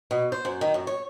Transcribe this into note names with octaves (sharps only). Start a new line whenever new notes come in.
B2
C5
F#2
D#3
F#2
C#5